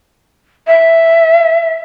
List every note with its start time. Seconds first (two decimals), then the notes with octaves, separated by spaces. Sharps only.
0.67 E5